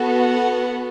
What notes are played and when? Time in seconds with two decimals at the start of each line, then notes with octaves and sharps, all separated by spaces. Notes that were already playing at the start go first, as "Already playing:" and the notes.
Already playing: B3 F#4 A4
0.18 F#5